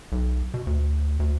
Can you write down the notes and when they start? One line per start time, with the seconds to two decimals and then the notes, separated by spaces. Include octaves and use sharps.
0.12 B1
0.54 B2
0.67 D2
1.20 D2